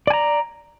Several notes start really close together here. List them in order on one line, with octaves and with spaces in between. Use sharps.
D5 G#5 A#5